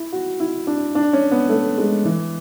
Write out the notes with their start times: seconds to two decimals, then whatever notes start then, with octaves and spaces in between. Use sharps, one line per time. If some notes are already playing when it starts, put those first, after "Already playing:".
Already playing: E4
0.12 F#4
0.40 E4
0.67 D4
0.95 D4
1.13 C#4
1.31 B3
1.49 A3
1.78 G#3
2.05 E3